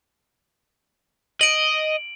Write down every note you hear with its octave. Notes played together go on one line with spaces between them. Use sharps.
D#5 D7 F#7